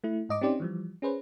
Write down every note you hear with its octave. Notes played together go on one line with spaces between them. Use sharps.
A3 E4
G#2 D#5 D6
C4 C#4 D#4 G4 C5 D5
E3 F3 G3
C#4 G#4 B4 C5